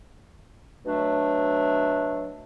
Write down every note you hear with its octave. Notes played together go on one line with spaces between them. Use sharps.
B2 F#3 A3 D4